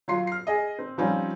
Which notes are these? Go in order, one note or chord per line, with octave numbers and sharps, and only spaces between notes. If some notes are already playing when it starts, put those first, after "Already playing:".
F#3 F4 C6 C7
F6 C7
G#4 D#5
C4
F3 G3 C4 C#4 D#4 F4